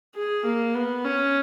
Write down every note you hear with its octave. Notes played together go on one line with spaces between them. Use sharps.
G#4
A#3
B3
C#4